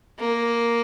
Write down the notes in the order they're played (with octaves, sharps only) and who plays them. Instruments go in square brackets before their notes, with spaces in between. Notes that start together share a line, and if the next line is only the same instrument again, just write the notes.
[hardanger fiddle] A#3